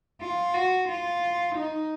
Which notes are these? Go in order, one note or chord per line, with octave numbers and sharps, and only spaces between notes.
F4
F#4
F4
D#4